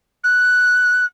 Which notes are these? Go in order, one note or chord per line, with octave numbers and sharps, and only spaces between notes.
F#6